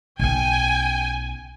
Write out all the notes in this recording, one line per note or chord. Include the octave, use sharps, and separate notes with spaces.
B1 C#4 G5 G#5